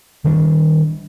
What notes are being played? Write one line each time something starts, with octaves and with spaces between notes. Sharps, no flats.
D#3 G3 D4